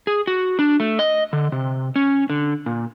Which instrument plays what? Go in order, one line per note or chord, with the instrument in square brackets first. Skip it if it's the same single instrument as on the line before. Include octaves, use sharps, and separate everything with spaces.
[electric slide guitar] G#4
F#4
D4
A3
D#5
D3
C3
C#4
D3
A#2